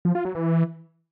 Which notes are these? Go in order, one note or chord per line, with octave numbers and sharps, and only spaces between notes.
F3
F4
F#3
E3